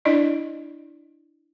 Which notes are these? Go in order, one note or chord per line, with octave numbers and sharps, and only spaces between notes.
D4 E4 D5 D#5